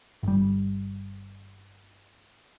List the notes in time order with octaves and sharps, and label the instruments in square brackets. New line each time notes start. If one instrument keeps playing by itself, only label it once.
[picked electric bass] G1 G3